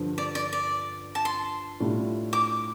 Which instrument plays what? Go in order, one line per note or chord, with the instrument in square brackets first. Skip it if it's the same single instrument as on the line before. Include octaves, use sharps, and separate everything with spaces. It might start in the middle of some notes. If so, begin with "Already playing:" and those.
Already playing: [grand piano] G2 D3 F3
[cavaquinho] D5
D5
D5
A5
C6
[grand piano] A2 G3 D4 F4
[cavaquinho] D6